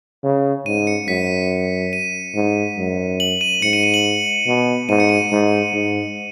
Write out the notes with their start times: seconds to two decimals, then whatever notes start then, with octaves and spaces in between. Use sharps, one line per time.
0.24 C#3
0.66 G#2 D#7
0.87 C#7
1.08 F#2 B6
1.93 D#7
2.35 G#2
2.77 F#2
3.20 F#7
3.41 D#7
3.62 G#2 C#7
3.73 D#7
3.83 D#7
3.94 F#7
4.47 B2
4.89 G#2 D#7
5.00 C#7
5.09 D#7
5.32 G#2
5.73 G#2